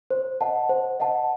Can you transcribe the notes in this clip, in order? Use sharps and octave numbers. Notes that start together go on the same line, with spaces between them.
C5
D#5 F#5 A5
C5
D#5 F#5 A5